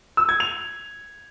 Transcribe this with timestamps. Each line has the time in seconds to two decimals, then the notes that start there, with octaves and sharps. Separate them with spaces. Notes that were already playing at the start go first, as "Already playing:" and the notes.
0.17 E6
0.29 G#6
0.40 F7